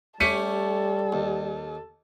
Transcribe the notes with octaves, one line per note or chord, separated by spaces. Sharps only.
G3 A3 C#4 G4 A4 B6 C#7 D#7
D#2